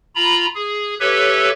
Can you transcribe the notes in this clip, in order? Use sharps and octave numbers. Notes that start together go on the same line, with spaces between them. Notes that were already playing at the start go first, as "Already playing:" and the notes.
F4 A#5 B5
G#4
G4 A4 B4 C#5 E5